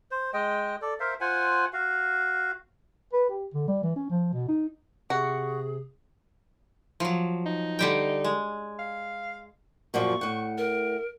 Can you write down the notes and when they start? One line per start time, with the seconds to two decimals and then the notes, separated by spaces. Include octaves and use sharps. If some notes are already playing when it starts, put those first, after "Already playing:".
0.11 C5
0.33 G#3 D#5 G5
0.82 A4 D5
1.00 A#4 C5 E5 F5
1.21 F4 C5 F#5 G#5
1.73 F#4 F5
3.13 B4
3.30 G4
3.54 D3
3.68 G3
3.83 E3
3.96 C#4
4.10 F3
4.33 B2
4.49 D#4
5.10 C3 F#4 G#4 C#6
7.00 F3 F#3
7.46 D#4
7.79 D3 G3 G5
8.24 G#3
8.79 F5
9.94 F#2 A#2 F3 C#6
10.21 A2 F#5
10.58 A#4